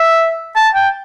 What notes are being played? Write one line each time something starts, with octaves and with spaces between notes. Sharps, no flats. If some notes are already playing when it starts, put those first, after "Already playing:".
Already playing: E5
A5
G5